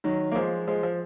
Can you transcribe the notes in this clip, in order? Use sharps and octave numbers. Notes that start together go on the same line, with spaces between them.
D#3 F#3
A#3
F3 G#3
F3 G#3
F3